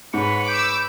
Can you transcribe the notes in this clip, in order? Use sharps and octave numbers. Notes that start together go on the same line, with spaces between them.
G#2 B4 C#5 F#5 B5
D6 E6 G6